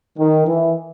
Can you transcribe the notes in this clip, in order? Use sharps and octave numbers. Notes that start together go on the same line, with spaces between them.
D#3
E3